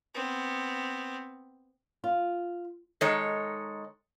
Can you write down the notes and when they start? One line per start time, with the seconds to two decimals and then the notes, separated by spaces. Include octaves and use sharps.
0.15 B3 C4
2.04 F4
3.01 D#3 G#3 D#4 A4 C#5